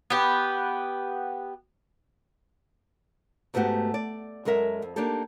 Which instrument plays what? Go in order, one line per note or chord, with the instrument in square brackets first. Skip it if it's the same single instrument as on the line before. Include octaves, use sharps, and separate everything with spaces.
[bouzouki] B3 G4
[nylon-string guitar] G#2 A3 B3 F#4 G4
D5
F#2 G#3 A4 A#4 E5
F2
A#3 D4 D#4 G4 A4